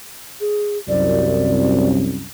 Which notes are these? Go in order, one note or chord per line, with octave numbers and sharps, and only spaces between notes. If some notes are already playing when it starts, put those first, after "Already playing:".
G#4
C2 F#2 D5